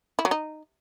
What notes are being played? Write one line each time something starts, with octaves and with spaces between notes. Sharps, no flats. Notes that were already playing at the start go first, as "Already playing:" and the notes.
E4
F#3
D#4